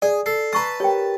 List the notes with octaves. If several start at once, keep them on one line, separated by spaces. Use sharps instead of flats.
G#4 D5
A4 C7
B4 A5 A#5 C#6 E6
G4 A#4 C#5 G5